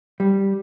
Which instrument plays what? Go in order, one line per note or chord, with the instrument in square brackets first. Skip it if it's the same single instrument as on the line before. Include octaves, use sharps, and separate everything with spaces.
[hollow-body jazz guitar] G3